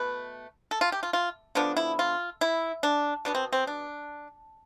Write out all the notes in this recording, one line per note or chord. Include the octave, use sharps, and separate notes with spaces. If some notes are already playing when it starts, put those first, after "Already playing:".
Already playing: B2 A3 B4
A4
F4
G4
F4
F4
D3 F3 B3 D4
E4
F4
E4
D4
B2 B3 D4
C4
C4
D4